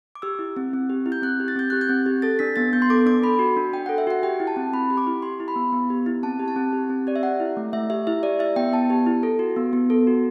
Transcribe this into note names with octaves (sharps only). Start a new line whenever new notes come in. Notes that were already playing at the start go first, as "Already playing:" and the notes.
D6
G4 E6
E4
C4
C4
G4
E4
G6
C4 F#6
G4
A6
C4 G6
G4 F#6
G6
C4
G4
A4 A6
D4 B6
B3 A6
B3 G6
C6
A4 D6
D4 D6
A4 B5
F#4
D4
D4 G5
F#5
A4
E5
F#4 F#5
G4 G5
E4
A5
C4
C4 B5
G4
D6
E4
G4 C6
E4
B5
B3
B3
G4
E4
C4 A5
G4
A5
C4
G4
C4
G4 D5
E5
G4 F#5
E4
A3
A3 E5
G4 E5
E4 E5
G4 D5
E4 E5
B3 G5
B3 A5
G4
E4
A4
F#4
B3
B3
A4
F#4